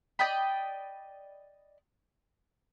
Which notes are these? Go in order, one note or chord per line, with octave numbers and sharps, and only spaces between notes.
D5 D#5 G5 B5